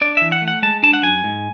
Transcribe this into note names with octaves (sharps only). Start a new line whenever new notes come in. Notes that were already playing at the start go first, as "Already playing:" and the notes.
D4 D5
E3 E5
F#5
A3
F#5
G#3 A5
D4 A5
F#5
F#2 G#5
G#2